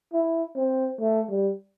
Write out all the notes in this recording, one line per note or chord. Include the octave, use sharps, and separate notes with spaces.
E4
C4
A3
G3